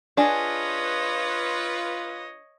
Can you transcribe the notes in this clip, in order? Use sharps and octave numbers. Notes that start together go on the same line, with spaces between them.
D4 F4 G#4 B4 C#5 D#5